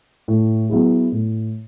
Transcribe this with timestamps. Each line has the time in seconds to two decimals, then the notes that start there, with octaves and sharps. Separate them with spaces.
0.28 A2
0.70 F#3 B3 E4 G#4
1.12 A2